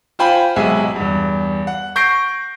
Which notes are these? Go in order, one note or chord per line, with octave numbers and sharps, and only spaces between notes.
F4 C5 G5 G#5 B5
B1 C3 G#3 E5 F#5 G#5
E2 G2
F#5
C#6 G6 A#6 C7 D7